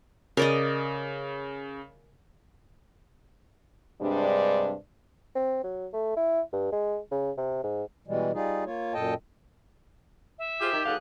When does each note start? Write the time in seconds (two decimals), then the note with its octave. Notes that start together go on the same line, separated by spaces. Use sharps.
0.37 C#3 A#4 D5 D#5
4.01 G2 C3 G3 G#3 D4
5.35 C4
5.64 F#3
5.93 A3
6.16 E4
6.53 G2
6.72 G#3
7.11 C#3
7.37 C3
7.63 G#2
8.07 B2 E3 G3 G#3
8.33 G3 D#4 F4 G#4
8.66 A#3 F4 C#5
8.94 F#2 A#2 A4 D#5 G5 A5
10.39 E5
10.60 F4 G4 G#4 C5
10.72 D#3
10.85 F#3 B3 D#4 G#4 A4 F5 F#6